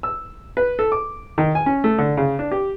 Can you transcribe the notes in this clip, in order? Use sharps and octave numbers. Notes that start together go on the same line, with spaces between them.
E6
B4
A4
D6
D#3
G#5
C#4
A3
D3
C#3
D4
G4